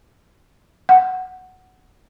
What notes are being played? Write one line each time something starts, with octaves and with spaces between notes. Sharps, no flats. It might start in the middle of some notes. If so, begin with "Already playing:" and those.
F#5